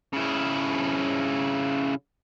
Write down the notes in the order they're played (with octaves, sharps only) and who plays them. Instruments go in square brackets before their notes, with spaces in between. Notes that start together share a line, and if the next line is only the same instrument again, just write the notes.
[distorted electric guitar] C#3 E4